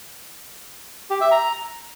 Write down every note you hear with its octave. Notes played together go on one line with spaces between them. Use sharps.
G4
E5
A#5